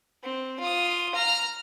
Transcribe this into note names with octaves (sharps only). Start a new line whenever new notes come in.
C4
F4 D#6
A#5 F6